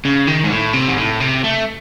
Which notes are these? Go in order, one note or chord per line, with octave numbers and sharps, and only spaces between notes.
C#3
D#3
G#2
A2
C3
G#2
A2
C3
A3